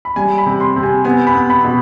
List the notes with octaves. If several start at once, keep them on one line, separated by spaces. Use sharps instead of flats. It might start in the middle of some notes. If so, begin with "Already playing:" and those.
B5
G3 G#5
B5
C3
C6
C3
G#5
B3 G#5
B5
B3
B5
B2